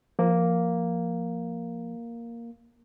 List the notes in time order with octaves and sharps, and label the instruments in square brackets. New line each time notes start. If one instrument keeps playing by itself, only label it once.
[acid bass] F3 [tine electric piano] A#3